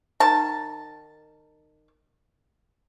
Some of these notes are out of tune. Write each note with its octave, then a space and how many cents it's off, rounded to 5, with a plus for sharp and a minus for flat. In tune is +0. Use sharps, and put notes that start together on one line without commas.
D#3 -25 A5 +0